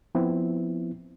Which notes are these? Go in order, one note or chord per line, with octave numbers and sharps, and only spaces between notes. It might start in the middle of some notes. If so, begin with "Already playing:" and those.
F3 B3 C4 E4